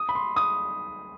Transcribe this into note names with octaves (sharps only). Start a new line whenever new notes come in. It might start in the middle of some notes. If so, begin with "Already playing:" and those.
Already playing: D#6
B5
C6
D#6